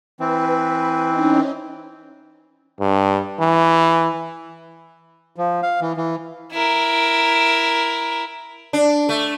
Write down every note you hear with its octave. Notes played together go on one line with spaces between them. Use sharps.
E3 C4 B4
C#4 D#4
G2
E3
F3
F5
E3
E3
E4 A#4
D4
A3